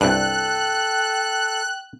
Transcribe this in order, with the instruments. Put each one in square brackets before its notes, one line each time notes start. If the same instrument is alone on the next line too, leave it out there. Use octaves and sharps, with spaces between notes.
[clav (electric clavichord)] C2 G2 [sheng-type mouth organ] A4 [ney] G5 [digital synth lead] F#6